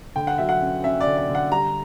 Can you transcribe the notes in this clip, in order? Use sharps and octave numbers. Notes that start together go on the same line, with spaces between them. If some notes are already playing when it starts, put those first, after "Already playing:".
D3 G5
F#5
F#3 E5
F#5
C#4
C#4 E5
D5
D3
D5
D3
F#5
G3 A#5